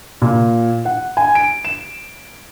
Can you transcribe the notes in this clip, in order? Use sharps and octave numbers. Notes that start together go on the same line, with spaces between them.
A#2
F#5
G#5
D7
E7